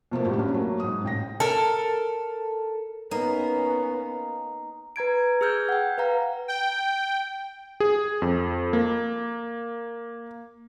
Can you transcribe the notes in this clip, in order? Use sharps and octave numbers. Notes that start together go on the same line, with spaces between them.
B2 F3 A3 A#3
G#1 A2 G3 C4
G2 F#3 C#4
F#3 A3 A#3
G#2 D#6
A1 G5 A#6
A4 A#4
A#3 B3 C#4 D#4
B4 A#5 G#6 D7
G#4 E6 F6 G6 G#6
F#5 G5
B4 F5 A#5
G5
G#4
F2
A#3